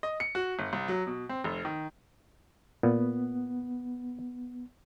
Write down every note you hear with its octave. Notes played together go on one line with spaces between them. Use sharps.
D#5
C#7
F#4
G1
C2
F#3
B2
C4
F1
D#3
A#2 B3